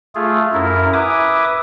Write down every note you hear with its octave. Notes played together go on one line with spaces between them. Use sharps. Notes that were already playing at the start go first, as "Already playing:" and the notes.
A3 F4 G#4
F#2 E4 A#4
B4 E5 G#5 D6 D#6